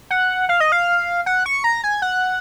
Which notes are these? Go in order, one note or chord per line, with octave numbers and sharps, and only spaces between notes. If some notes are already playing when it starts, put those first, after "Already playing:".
F#5
F5
D#5
F5
F#5
C#6
A#5
G#5
F#5